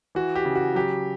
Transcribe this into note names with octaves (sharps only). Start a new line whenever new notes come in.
E3 F#4
G4
C#3
F#4
F#3 G4